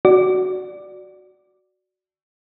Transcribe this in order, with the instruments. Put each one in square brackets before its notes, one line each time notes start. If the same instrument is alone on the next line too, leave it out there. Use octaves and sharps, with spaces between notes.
[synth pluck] F#4 D5